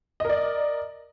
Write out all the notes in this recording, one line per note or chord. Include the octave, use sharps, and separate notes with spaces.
A#4 D5 D#5